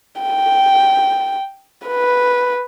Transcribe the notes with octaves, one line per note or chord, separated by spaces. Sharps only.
G5
B4